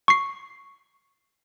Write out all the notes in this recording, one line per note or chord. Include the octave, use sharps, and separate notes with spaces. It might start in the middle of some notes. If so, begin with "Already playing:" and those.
C#6 C7